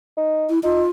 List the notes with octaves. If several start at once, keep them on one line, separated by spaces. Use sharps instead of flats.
D#4
E4
D#4 F4